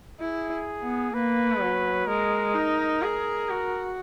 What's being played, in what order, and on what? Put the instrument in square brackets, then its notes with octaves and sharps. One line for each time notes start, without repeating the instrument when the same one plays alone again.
[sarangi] E4 [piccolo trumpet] G#4
[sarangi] B3
[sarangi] A#3 [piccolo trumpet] B4
[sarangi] F#3
[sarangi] G#3 [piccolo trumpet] A#4
[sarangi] D#4
G#4
F#4